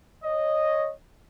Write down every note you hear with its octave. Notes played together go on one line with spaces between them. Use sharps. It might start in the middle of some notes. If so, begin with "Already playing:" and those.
C#5 D#5